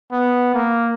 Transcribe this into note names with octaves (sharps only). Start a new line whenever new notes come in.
B3
A#3